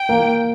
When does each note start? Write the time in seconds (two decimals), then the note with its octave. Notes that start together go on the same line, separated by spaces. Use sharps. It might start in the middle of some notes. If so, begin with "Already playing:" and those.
Already playing: G5
0.09 A#3